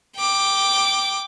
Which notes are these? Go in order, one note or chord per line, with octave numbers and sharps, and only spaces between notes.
G5 D6